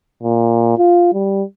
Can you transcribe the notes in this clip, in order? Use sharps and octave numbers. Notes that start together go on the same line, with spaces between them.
A#2
F4
G3